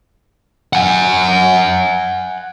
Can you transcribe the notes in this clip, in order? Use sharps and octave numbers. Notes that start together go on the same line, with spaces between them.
F#5 G#5